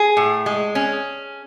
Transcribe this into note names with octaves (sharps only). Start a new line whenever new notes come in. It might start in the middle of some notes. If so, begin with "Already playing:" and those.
Already playing: G#4
A2
G#3
C#4